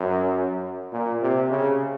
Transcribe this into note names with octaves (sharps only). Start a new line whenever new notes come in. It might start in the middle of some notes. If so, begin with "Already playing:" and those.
Already playing: F#2
A#2
C3
C#3